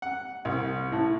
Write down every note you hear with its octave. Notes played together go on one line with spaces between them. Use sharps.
F#5
C2
A2